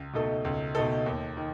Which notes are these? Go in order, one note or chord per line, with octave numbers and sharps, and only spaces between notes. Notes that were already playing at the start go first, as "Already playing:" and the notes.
Already playing: C#2
B2 A3 D#4 A4
C#2
B2 A3 D#4 A4
D#2
D#3